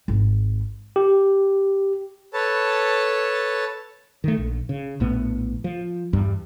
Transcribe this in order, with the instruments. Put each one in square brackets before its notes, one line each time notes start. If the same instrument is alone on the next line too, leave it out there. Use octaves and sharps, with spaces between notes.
[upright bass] G#1
[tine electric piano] G4
[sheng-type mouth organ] A4 B4 C#5 A5
[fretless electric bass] D#3 A3
A#1
C#3
A#1 A2 B3
F3
E2 G2 G3